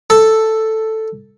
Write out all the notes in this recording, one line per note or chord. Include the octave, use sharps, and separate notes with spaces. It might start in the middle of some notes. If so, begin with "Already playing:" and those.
A4